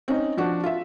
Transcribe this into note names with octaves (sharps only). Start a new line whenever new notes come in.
C4 C#4 D#4
F3 D4 F#4
F4 E5